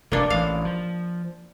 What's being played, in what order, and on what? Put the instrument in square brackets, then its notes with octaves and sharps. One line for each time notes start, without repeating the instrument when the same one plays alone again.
[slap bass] F1 A2 [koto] A#3 D4
[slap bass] A1 [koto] F5
[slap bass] F3